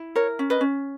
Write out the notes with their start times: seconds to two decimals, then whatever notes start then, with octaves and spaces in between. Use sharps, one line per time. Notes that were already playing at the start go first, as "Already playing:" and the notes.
Already playing: E4
0.15 A#4 C#5
0.39 C#4
0.50 B4 D#5
0.61 C#4